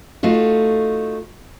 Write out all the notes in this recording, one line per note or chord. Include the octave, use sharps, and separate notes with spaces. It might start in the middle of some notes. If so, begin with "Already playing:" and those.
A3 D#4 F4 F#4